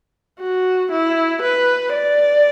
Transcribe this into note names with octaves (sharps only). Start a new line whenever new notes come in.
F#4
E4
B4
D5